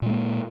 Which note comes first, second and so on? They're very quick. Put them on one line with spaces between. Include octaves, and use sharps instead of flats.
A#2 G#3 A#3